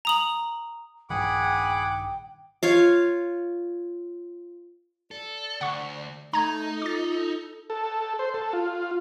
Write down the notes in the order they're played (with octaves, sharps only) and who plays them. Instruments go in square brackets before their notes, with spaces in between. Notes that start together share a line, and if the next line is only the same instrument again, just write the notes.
[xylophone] A#5 D#6 F#7
[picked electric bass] A#1 G2 D#3 [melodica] G#4 F#5 B5 [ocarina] G5 [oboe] D6
[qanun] F4 C#5 F5
[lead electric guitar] A4 [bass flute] D5
[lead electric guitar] D2 [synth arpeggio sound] F#5 C#6
[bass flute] A3 [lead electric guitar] D#4 [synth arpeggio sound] A#5 G#6
[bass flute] F4 [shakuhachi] A4 [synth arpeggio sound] D6 A6
[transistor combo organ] A4
C5
A4
F4